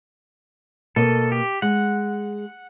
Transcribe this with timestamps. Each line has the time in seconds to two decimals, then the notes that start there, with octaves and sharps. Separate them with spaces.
0.96 B2 A#3 A4 D#5
1.32 G4
1.62 G#3 F#5